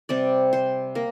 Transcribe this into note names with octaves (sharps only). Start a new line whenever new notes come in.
C3 G3 C4 D5
C5
A#3 A#4